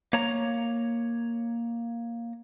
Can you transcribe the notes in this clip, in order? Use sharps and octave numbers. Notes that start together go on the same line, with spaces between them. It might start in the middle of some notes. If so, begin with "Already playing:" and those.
A#3 C#5 A#5